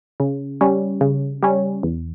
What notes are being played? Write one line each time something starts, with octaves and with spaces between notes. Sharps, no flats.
C#3
G3 C#4
C#3
G3 C#4
E2